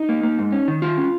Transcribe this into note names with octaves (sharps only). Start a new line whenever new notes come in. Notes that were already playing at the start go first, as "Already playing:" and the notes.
Already playing: D#4
A#3
A#3
G#2
C#4
D#3
D#3 F4
C#4